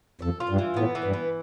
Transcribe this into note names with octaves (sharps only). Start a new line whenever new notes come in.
F2 A4
F4
G2
E3
A2 B3
E3
G2
B3